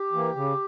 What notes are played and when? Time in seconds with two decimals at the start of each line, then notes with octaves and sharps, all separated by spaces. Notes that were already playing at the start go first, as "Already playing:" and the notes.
Already playing: G4
0.13 E3 A#3
0.35 C#3